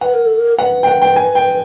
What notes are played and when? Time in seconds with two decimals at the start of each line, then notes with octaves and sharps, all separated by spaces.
0.01 B4 F#5
0.14 A#4
0.25 A4
0.37 A#4
0.58 B4 F#5
0.83 G5
0.87 F#5
1.02 G5
1.16 G#5
1.35 G5